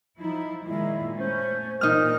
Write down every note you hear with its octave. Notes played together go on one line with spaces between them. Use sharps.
F3 D#4 E4
A#2 D#3 G#3 E4
A3 C#4 C5
A#2 E3 C4 D#4 A#4 F6